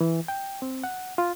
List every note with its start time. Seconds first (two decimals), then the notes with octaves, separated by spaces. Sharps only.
0.01 E3
0.28 G5
0.62 C4
0.84 F#5
1.18 F4